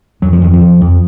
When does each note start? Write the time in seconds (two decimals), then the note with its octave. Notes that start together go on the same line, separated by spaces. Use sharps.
0.22 F2 F#3
0.33 F3
0.41 F2 D#3
0.53 F3
0.61 F2
0.81 F2